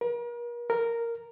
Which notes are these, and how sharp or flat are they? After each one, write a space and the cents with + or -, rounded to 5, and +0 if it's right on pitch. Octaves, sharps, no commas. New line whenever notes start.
A#4 +40
A#4 -5